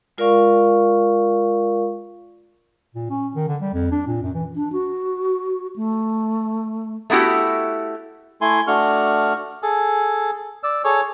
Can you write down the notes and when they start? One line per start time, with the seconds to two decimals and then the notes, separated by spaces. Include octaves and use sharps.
0.18 G#3 F4 A#4 D5 F5 C#6
2.95 A#2
3.10 C#4
3.35 D#3
3.48 D3
3.62 G3
3.74 F2
3.92 D4
4.07 A#2
4.22 F#2
4.35 E3
4.55 D4
4.72 F#4
5.76 A3
7.10 A3 B3 E4 F#4 G4
8.41 A3 E4 G#5 C6
8.67 A3 D4 F#4 C#6 F6
9.63 G#4 A4
10.63 D5 E6
10.84 G#4 A4 C#5